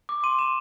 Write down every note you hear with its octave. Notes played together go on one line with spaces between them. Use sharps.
D6
C6 D#7
C6 E7